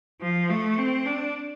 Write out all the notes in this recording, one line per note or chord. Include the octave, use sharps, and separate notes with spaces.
F3
A3
C4
D4